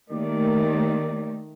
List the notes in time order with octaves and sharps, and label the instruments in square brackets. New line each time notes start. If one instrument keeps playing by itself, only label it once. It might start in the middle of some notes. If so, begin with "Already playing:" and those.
[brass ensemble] D#2 A#4 D5 [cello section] D#3 A3